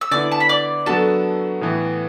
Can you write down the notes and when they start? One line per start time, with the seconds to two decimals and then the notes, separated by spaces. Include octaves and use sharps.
0.01 E6
0.11 D3 B3 E4 D5 D6
0.32 A5
0.40 B5
0.49 D5 D6
0.86 F#3 B3 D4 F#4 A4 A5
1.61 A2 E3 B3